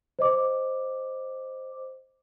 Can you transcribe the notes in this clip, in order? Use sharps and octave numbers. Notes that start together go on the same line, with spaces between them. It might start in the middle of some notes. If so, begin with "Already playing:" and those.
C5 D#5 D6